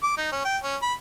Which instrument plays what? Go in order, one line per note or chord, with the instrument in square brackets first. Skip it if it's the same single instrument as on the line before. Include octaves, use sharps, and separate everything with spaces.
[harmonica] D6
D#4
C#4
G5
C#4
B5